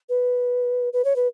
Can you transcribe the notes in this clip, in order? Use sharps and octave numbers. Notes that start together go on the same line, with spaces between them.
B4
B4
C#5
B4